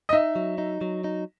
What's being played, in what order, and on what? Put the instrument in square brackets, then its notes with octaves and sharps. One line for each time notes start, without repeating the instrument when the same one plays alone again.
[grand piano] D#5
[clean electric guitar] D#4 [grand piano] E5
[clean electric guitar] F#3
D#4
F#3
D#4